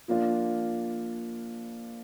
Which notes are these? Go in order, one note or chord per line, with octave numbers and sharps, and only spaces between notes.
F3 A#3 D4 F4